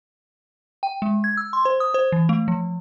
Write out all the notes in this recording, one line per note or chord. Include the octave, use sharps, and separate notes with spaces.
G5
G#3
G#6
E6
C6
C5
D#6
C5
E3
A3
F3